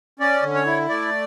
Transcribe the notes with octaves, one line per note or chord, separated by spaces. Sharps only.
C#4 D5
D3
C#5
E4
A3 D5